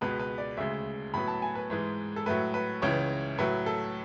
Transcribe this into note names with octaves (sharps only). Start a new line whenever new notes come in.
C#2 B2 G#3 B3 B4
B4
D5
D2 C#3 G#3 E5
A2 F#3 B3 B5
A5
G#5
B4
G#2 E3 G#3
A4
A2 F#3 A3 B4
B4
C#2 C#3 E3 C#5
A2 F#3 A3 B4
A4